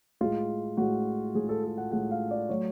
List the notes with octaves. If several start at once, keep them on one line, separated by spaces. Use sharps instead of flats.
A2 G#3 F4
A2 G#3 F#4
A2 G#3 G#4
A4
A4
F#5
A2 G#3 F#5
F5
D5
F#3 A3 C#5